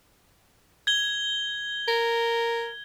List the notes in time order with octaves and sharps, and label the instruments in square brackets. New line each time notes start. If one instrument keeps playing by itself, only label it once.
[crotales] G#6 G7
[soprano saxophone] A#4